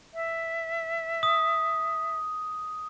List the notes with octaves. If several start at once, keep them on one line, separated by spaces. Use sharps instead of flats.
E5
D#6